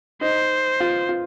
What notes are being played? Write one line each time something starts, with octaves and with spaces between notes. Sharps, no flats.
D#4 C5
F4
F4